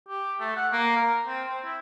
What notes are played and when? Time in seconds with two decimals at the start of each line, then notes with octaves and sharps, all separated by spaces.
0.09 G4
0.40 A3
0.56 F#5
0.72 A#3
0.97 A#4
1.27 C4
1.48 C4
1.64 E4